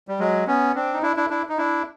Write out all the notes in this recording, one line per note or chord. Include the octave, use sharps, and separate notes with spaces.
G3
F#3 G#3
B3 C#4
C4 D4
D#4
D4 E4
D4 E4
D4 E4
D#4
D4 E4